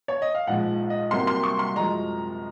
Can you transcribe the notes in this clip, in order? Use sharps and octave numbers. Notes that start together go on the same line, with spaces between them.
C#5
D#5
F5
A#1 G#2 F3 G#3 F#5
D#5
C2 C3 F#3 A#3 C6
C6
C#6
C6
F#2 F3 G#3 A#5